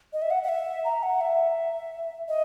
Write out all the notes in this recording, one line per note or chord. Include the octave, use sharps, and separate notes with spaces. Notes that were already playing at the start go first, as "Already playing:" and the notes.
D#5
E5
F#5
F#5
E5
A#5
F#5
E5
D#5